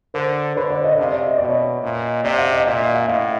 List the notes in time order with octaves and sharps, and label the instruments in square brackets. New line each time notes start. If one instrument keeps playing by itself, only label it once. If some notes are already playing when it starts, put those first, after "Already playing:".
[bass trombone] D3 [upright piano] A#4 C5
[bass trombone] D3 [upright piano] B4 C#5
[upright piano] C5 D5
C#5 D#5
[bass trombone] C3 [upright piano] D#5 F5
[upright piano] D5 E5
D#5
[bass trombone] B2 [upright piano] D5
[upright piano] C#5 D#5
[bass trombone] A#2
[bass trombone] C3 [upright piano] D5 E5
[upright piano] E5 F#5
D#5 F5
[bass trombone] A#2 [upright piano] D5 E5
[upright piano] D#5 F5
E5 F#5
[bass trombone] A2 [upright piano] D#5 F5